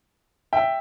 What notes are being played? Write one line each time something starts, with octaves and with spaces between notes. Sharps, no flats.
E5 G5